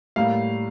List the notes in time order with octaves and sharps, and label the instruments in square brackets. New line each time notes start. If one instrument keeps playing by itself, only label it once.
[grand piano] A2 G3 A#3 F5